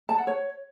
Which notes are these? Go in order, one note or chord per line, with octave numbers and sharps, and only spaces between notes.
A5
F#5
C#5